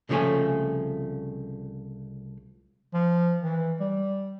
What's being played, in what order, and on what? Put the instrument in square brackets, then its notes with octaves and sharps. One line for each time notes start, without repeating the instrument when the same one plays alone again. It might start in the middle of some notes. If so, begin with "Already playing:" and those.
[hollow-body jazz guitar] C2 C#3 F3 A3 G5 G#5
[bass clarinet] F3
E3
G3